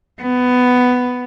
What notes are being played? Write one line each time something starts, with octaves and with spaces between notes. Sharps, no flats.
B3